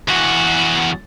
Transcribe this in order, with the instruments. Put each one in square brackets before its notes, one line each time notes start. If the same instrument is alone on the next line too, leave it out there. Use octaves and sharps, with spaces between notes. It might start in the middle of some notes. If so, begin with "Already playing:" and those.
[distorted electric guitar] E2 F#4